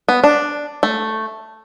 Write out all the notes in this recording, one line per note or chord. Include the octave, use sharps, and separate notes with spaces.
B3
D4
A3